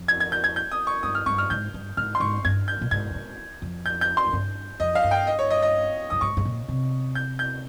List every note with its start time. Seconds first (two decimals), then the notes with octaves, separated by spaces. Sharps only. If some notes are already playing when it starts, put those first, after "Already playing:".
Already playing: F2
0.08 G#6
0.20 G#6
0.32 G6
0.44 G#6
0.56 G6
0.72 D#6
0.87 C#6
1.03 G2 D#6
1.15 F6
1.26 G2 C#6
1.38 F6
1.50 G#2 G6
1.74 G2
1.97 G#2 F6
2.15 C6
2.20 G#2 C#6
2.45 G2 G#6
2.68 G6
2.81 A#2
2.91 G#2 G#6
3.11 G2
3.15 G#2
3.62 F2
3.86 G6
4.01 G6
4.17 C6
4.26 G#2
4.33 G2
4.80 F2 D#5
4.95 F5
5.04 G2
5.11 G5
5.27 D#5
5.39 C#5
5.51 D#5
5.62 D#5
6.10 G2 D#6
6.21 G#2 C#6
6.37 G#2
6.45 A#2
6.69 C3
7.15 G6
7.39 G6